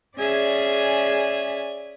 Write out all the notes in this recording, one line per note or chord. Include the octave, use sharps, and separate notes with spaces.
C#4 G#4 D5 E5 G#5